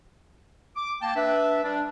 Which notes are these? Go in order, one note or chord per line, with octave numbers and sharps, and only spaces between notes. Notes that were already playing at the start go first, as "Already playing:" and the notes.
D6
A#3 G5 A5
D4 B4 E5
G3 D4